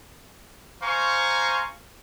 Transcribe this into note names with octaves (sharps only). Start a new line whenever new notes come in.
C5 F5 G#5 A#5 C6 C#6